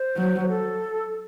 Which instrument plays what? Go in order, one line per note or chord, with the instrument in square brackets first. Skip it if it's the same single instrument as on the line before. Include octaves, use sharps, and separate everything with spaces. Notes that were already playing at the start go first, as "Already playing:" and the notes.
Already playing: [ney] C5
[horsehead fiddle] F#3
[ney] C5
A4